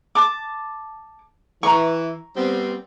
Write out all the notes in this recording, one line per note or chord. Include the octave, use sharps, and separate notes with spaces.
A5 D6
E3 A#5 C#6
G3 B3 C4